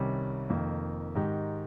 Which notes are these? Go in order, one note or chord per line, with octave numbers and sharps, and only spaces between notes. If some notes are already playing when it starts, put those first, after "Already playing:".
Already playing: C2 C3 D#3 G3 C#4
F1 F2 D#3 A#3
G#2 D#3 G#3 D#4 G4